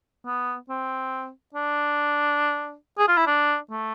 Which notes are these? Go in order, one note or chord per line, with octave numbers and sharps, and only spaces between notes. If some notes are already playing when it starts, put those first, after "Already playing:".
B3
C4
D4
G#4
F4
E4
D4
A3